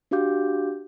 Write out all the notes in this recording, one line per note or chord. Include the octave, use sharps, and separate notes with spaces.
D4 F#4 G4 F5 D6 G6